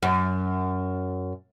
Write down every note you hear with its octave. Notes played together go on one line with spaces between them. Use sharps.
F#2